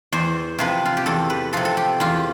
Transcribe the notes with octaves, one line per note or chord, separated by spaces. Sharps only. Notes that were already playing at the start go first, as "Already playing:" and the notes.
E2 C5
C3 F3 B4
F4
G4
E2 A4
B4
C3 F3 A4
A4
G4
E2 F4